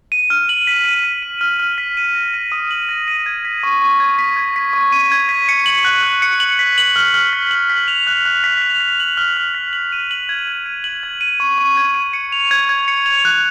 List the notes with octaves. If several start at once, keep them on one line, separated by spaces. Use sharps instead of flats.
D#7
F6
F#7
B6
D#7
B6
D#7
F6
F6
B6
D#7
A#6
D#7
D#6
F#7
A#6
D#7
G#6
B6
C#6
C#6
G#6
B6
G#6
B6
C#6
D#7
G#6
B6
C#7
F#7
F#6
F#6
C#7
F#7
B6
F#7
F6
F6
B6
F#7
B6
F7
F#6
F#6
B6
F7
B6
F#7
F6
F6
B6
F#7
D#7
F#7
G#6
G#6
D#7
F#7
G#6
D#7
C#6
C#6
G#6
D#7
C#7
F7
G#6
G#6
C#7
F7
F#6